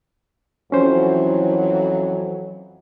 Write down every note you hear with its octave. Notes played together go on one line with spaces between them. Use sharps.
F2 E3 F#3 C#4 C5